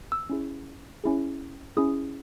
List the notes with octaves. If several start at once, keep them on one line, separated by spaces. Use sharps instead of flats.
E6
C#4 E4 G#4
C#4 E4 G#4
C#4 E4 G#4 D#6